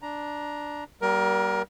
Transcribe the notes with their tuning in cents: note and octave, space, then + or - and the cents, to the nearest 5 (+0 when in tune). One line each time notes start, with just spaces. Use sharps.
D4 +0 A#5 +15
G3 -25 A#3 +30 A#4 +20